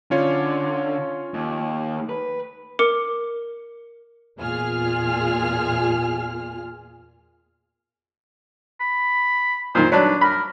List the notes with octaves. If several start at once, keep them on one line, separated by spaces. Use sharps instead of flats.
D3 C#4 F4 C#5
D#2
B4
A#4 D6 C#7
E2 A#2 F4 G#4 F6
B5
A#2 D#3 C5
F#3 D4 B4
A#4 B5